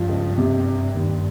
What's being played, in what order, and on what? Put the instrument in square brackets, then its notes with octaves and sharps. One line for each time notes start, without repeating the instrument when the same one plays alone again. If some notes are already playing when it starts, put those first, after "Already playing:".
Already playing: [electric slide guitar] G2 [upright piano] F3
[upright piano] C#2
C3
G3
D#2